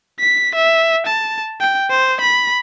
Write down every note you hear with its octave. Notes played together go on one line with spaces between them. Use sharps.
B6
E5
A5
G5
C5
B5